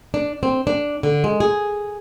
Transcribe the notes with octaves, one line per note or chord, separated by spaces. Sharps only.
D4
C4
D4
D3
G#3
G#4